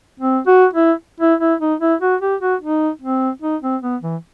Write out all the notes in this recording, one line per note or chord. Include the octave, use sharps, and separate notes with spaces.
C4
F#4
E4
E4
E4
D#4
E4
F#4
G4
F#4
D#4
C4
D#4
C4
B3
E3